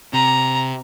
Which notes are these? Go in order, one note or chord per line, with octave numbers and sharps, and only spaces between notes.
C3 A#5